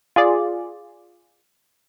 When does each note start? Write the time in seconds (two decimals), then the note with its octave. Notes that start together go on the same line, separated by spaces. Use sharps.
0.16 F4 G#4 D5